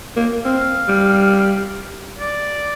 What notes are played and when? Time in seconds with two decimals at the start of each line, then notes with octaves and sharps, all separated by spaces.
0.17 A#3
0.45 C4 F5
0.88 G3
2.19 D5